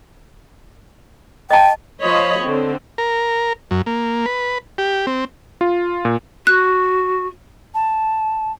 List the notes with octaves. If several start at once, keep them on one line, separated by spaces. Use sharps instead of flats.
D#5 G5 A5
F3 C5 C#5 D#5 B5
D3 C4
A#4
F#2
A#3
B4
G4
C4
F4
A#2
F#4 F#6
A5